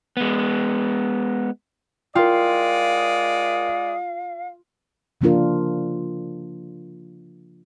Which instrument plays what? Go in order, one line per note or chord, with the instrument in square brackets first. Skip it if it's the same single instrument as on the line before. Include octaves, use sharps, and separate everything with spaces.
[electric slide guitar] G#3 B3
[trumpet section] G#3 D5 D#6 [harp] F4 [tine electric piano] A#4 G5 [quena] F5
[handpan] C#3 F3 A#3 D4 F4 A#4